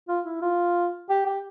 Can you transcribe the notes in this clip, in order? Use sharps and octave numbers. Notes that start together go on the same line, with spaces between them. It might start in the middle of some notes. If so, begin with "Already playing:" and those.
F4
E4
F4
G4
G4